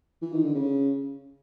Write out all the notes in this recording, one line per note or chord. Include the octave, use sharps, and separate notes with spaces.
E3
D#3
D3
C#3